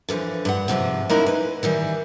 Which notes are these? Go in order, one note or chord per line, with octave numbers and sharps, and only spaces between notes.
D3 E3 F3
G2 F#5
G#2 C3 F3
G#3 A#3 C#4 D#4 E4 A#4
B4
D#3 E3 G3